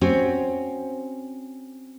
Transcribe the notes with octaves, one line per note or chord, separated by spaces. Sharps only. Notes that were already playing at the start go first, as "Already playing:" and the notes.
C4 C#4 F#4